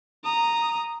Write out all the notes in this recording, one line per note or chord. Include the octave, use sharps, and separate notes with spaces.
A#5 D#6